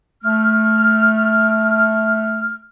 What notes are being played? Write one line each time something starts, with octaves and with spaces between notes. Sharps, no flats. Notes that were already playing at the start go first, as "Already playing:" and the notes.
A3 F6